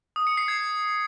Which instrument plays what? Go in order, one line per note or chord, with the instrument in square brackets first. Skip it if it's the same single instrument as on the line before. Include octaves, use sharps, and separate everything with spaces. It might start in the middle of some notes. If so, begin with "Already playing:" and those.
[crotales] D#6
C#7
C7
G#6